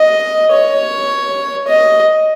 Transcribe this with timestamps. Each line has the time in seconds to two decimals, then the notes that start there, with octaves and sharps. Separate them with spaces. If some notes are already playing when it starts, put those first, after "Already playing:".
Already playing: D#5
0.52 C#5
1.68 D#5